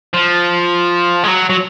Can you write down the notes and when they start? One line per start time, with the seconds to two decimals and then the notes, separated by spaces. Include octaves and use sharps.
0.14 F3
1.24 G#3
1.28 F#3
1.50 F#3